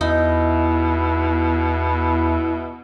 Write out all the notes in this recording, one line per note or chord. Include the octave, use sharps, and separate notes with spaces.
E2 B2 D#4 E4